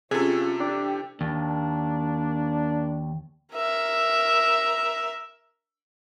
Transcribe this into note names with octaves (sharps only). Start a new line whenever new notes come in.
C3 C#4 F4 G#4 A4
D4 G4
D#2 A#3 D4
A#4 E5